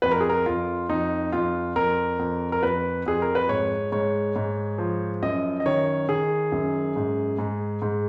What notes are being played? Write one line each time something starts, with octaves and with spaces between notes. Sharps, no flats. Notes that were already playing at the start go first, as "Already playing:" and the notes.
F2 B4
A#4
G#4
A#4
F2 F4
F2 D#4
F2 F4
F2 A#4
F2
A#4
F2 B4
F2 G#4
A#4
B4
G#2 C#5
G#2 C#5
G#2
F3
F#2 D#5
D#5
D#3 C#5
D#3 G#4
F#2
G#2
G#2
G#2